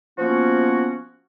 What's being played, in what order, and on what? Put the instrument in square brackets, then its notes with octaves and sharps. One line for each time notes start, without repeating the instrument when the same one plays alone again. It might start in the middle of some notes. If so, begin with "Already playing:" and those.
[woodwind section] F3 A#3 B3 C#4 F#4